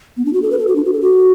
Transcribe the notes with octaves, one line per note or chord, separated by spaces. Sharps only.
B3
D4
F#4
A4
B4
A4
F#4
D4
F#4
A4
F#4